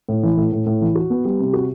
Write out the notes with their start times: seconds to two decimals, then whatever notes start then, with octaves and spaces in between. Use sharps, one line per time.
0.09 A2
0.23 E3
0.37 A2
0.52 A2
0.66 A2
0.81 E3
0.95 F#4
1.10 B3
1.25 G3
1.39 C3
1.53 F#4